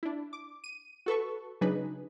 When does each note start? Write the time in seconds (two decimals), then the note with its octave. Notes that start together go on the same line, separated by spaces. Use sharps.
0.03 D4 E4
0.33 D6
0.64 D#7
1.06 F#4 A4 B4 C#6
1.61 C#3 F#3 D4 D#4 G#4 B4